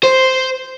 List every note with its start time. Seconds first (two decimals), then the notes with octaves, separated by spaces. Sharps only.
0.03 C5